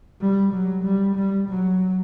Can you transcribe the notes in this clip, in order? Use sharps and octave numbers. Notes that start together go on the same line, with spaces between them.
G3
F#3
G3
G3
F#3